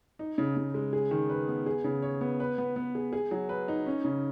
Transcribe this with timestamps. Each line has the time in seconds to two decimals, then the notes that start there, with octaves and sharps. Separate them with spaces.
0.19 D#4
0.38 C#3
0.57 C#3
0.74 G#3
0.93 G#4
1.11 D#3
1.29 B4
1.48 B3
1.66 G#4
1.84 C#3
2.02 C#5
2.21 B3
2.40 B4
2.58 B3
2.76 B3
2.95 G#4
3.13 G#4
3.31 F#3
3.49 B4
3.68 D#4
3.86 C#4
4.04 C#3